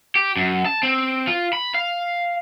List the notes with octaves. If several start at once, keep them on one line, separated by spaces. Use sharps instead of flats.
G4
F#2
A5
C4
F4
B5
F5